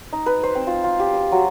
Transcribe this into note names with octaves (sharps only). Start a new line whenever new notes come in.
D#4
B4
C5
C4
F4
F4
G4
C6
F#3